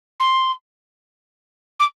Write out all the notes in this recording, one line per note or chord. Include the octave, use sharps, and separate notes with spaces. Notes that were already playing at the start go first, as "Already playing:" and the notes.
C6
D6